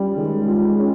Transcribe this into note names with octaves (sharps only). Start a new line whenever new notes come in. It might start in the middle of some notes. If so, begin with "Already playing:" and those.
Already playing: G3 C#4 F4
D#3 G#3
F4
C#4